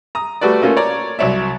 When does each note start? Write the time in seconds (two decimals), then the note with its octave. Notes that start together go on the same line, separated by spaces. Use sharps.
0.15 A#5 D#6
0.41 G3 A3 F#4 B4 D5
0.62 A3 A#3 C#4 F4
0.77 C#5 D5 A#5
1.19 C2 F#3 C#5 D5 E5